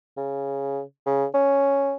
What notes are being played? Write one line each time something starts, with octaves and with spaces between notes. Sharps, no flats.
C#3
C#3
C#4